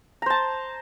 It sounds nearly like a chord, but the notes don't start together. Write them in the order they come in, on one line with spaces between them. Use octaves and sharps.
A#5 C5 A5